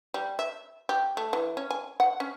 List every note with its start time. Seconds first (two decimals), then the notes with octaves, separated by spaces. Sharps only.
0.14 G3
0.39 E5
0.89 G4
1.17 A3
1.33 E3
1.57 C#4
1.70 G#5
2.00 F#5
2.20 C#4